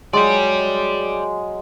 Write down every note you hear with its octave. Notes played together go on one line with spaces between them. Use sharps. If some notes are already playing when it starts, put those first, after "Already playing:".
F#3 G#3 D5 G5